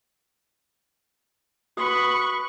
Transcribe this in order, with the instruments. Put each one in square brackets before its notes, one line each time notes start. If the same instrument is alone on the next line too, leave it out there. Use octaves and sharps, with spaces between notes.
[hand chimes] F#4 D#6 [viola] B4 C#6 [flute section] B5